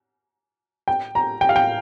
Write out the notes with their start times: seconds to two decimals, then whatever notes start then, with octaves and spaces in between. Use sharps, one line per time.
0.88 G5
1.15 A#5
1.41 G5
1.49 F5
1.56 G5